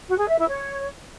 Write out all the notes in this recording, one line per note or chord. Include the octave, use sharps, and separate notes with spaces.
F#4
G#4
E5
E4
C#5